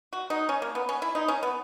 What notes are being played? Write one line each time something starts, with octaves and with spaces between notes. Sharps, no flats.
F#4
D#4
C#4
A#3
B3
C#4
E4
D#4
C#4
B3